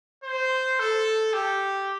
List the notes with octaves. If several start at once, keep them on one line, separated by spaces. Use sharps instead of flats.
C5
A4
G4